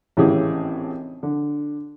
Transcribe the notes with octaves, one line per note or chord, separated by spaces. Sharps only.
G#1 A2 C#3 E3 G4 G#4
D3